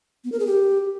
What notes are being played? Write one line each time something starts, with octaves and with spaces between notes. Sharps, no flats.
B3
A#4
G#4
G4